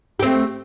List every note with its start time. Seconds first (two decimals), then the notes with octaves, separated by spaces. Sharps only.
0.20 G4
0.22 C4
0.25 A3